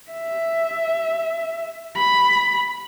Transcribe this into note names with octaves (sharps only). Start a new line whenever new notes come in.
E5
B5